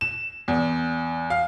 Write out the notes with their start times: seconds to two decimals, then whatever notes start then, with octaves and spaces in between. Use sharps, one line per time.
0.01 E7
0.48 E2
1.30 F5